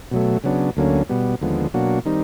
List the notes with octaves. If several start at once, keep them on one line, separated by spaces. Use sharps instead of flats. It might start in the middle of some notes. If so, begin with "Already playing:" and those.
B2 F#3 A3
C#3 F#3 B3 D4
D2 D3 F#3 A#3 C#4
B2 G3 B3
D#2 D3 F3 G#3 B3
B2 F#3 A#3 D4 F#4
D#3 G3 C4 D#4